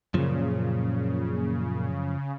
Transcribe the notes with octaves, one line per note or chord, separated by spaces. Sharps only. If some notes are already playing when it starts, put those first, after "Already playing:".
F#2 A#2 C#3 F3